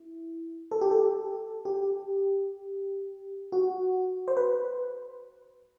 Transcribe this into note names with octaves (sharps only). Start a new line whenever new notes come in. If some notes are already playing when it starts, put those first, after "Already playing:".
Already playing: E4
A4
G4
A4
G4
F#4
C5
B4